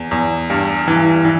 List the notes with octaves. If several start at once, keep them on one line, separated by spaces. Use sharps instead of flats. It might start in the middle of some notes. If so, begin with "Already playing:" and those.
Already playing: E2
E2
G2
E3
E3